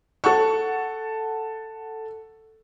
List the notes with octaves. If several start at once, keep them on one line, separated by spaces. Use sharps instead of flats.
A4 F#5 C#6